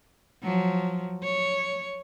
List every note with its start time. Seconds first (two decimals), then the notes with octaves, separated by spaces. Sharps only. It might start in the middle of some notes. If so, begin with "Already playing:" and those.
0.43 F3 F#3
1.23 C#5